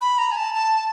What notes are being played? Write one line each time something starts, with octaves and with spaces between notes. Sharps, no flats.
B5
A#5
G#5
A5
A5